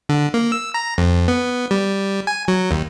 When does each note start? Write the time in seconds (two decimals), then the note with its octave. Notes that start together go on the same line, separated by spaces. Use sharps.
0.09 D3
0.34 A#3
0.52 E6
0.74 A#5
0.98 F2
1.28 B3
1.71 G3
2.27 G#5
2.48 F#3
2.71 D#2